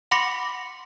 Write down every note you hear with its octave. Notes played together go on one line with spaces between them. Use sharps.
F#5 B5 C6 D6 A#6 C#7